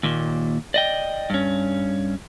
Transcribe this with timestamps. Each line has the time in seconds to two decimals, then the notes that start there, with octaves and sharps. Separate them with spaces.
0.03 D#2 A#2
0.74 D5 D#5 G5
1.30 G2 C#4